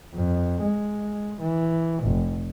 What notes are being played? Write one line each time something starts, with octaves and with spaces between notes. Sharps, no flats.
F2
G#3
E3
F1